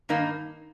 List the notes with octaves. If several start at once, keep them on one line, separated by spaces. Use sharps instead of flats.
G2 D#3 A#3 D#4